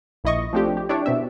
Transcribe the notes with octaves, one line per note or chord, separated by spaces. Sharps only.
A#1 E4 D#5 C#6
F3 A3 C4 D4 G4
G4
D4 E4 G4 C#5 D5
B2 C4 E5